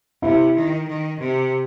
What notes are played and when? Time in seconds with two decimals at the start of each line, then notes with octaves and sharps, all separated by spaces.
0.22 C3 E4
0.55 D#3
0.88 D#3
1.20 C3